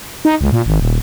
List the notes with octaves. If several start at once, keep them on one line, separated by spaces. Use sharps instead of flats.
D#4
C#2
A#2
G#1
D#1